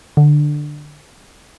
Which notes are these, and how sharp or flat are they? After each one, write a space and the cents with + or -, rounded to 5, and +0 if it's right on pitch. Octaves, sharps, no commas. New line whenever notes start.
D3 +15